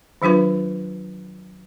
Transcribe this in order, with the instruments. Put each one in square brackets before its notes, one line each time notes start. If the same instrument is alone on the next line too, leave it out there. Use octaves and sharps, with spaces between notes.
[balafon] D#3 F#3 D4 F4 B4